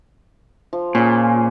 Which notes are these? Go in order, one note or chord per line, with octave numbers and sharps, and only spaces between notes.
F3
A#2 C#4 G#4